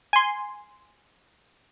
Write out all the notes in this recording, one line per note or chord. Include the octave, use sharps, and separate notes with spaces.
G#5 C6